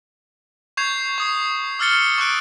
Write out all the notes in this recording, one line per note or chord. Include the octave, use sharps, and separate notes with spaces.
C#6 G6 G#6 C7 F7
C#6 D#6 C7
D6 E6 F6 A6 C#7 G7
C#6 D#6 F#6 D7